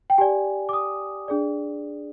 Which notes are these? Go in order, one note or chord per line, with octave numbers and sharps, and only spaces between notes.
G5
G4 D5 G#5
D6
D#6
D4 G#4 D5